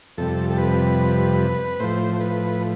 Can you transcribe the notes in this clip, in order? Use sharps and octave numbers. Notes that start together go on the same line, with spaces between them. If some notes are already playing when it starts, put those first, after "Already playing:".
F2 C3 G3 A4
A4
B4
A2 F3 C5
C5
B4